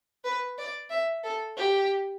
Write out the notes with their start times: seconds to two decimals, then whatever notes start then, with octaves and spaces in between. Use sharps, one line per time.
0.24 B4
0.58 D5
0.90 E5
1.24 A4
1.57 G4